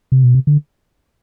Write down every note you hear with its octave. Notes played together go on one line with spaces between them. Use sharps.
C3
B2
C3
D3